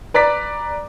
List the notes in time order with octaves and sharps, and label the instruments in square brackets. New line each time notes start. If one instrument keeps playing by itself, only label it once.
[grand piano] B4 D5 A#5 D6 A6 B6